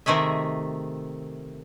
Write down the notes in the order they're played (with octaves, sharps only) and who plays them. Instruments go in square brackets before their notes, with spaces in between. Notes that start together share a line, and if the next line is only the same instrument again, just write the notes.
[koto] C3 D#3 A3 G#4 E5